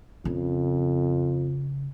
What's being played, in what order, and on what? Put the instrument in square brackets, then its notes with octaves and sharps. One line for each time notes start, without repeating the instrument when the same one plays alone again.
[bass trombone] F2 [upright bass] C#3